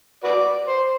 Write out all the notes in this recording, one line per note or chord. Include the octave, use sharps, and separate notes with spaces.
F#4 B4 D5
C5